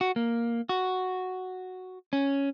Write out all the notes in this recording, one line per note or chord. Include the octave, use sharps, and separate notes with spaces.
F#4
A#3
F#4
C#4